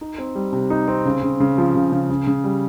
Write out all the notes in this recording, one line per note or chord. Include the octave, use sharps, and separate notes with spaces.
D#4
C4
G3
C3
D#4
C4
C#3
C#3
C#3
F3
C#3
C#3
C#3
C#3
G3